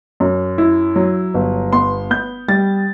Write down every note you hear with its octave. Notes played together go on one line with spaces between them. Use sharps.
F#2
E4
F#3
G1
B3 C6
B3 G6
G3 A6